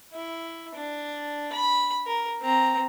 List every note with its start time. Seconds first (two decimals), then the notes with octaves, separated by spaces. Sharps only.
0.13 E4
0.75 D4
1.52 B5
2.06 A#4
2.41 C4 A#5